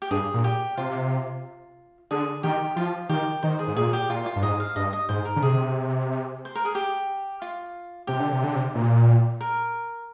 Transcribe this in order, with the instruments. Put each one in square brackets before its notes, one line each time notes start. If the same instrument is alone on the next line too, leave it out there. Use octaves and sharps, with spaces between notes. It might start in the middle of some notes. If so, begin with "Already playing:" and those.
[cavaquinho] G4
[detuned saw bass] G2 [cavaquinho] G#4
[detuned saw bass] A#2
[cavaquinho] G4
[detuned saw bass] C3 [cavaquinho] F4
[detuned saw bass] D3 [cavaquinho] G#4
[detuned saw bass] D#3 [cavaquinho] G4
[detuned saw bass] F3 [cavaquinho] F4
[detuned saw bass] D#3 [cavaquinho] G4
[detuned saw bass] D#3 [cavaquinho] C5
[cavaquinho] G#4
[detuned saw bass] G#2
[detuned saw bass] A#2 [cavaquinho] G#4
[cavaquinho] G4
[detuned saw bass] A#2 [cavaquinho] F4
[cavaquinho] F4
[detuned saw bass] G2
[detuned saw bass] G#2 [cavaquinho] D#5
[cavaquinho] F5
[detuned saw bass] G2 [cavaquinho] D#5
[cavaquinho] D#5
[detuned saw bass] G#2 [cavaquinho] C5
[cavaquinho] A#4
[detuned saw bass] D3
[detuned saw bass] C3 [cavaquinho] G#4
[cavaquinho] C5
A#4
G#4
G4
F4
[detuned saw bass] C3 [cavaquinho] G4
[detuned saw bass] D3
C3
D3
C3
A#2
[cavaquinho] A#4